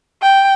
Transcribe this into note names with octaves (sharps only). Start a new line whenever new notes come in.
G5